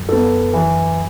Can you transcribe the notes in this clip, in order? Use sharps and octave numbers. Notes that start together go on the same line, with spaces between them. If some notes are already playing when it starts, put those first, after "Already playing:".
Already playing: F#2
B3 A4
E3